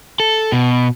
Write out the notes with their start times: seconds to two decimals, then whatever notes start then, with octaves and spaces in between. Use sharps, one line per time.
0.20 A4
0.52 B2